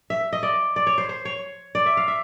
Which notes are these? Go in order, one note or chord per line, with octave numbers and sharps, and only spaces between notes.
E5
D#5
D5
D5
C#5
C5
C5
C#5
D5
E5
F5
E5